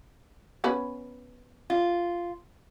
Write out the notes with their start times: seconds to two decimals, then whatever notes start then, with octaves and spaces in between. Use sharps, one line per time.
0.64 B3 C#4 B4
1.70 F4